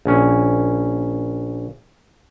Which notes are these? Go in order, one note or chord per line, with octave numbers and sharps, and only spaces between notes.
A#1 C#4